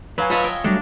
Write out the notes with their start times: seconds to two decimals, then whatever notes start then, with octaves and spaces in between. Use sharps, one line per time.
0.18 F#3 B4 C#5 F5 G#5
0.30 F4 C#5 D#5 E5 A5 B5
0.44 G5
0.64 F#3 G3 A3 D4